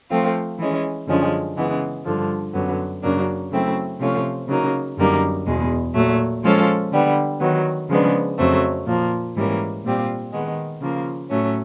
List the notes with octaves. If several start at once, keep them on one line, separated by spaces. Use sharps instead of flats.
F3 A3 C4 F4
E3 G#3 C#4
F#2 D3 F3 G#3 C#4
C#3 E3 G#3 B3
G2 D3 F3
F#2 D3 F#3 B3
F#2 C#3 F#3 A#3 D4
C#3 F#3 A3 C4 E4
C3 F3 A3 C#4 F4
C#3 F#3 A#3 D#4
F#2 D3 G3 A#3 D#4
E2 B2 G#3
A#2 F#3 A3
F3 G#3 C#4 F4 A4
D3 G3 B3
D#3 F#3 B3
C#3 F3 G#3 B3 D4
F2 C#3 F#3 A3 C4
A#2 F3 A#3
G#2 E3 G3 A#3 C#4
A#2 G3 C4 F4
D#3 G#3 B3
C#3 F3 A#3
A2 F#3 A3 C#4